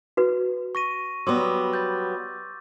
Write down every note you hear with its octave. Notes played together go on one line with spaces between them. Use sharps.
F#4 B4
C#6 A#6 D#7
F#3 G3 B3 C6 D6 E6
G6 A6